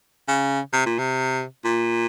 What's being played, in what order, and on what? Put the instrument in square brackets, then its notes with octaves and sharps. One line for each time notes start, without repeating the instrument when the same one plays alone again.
[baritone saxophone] C#3
C3
A#2
C3
A#2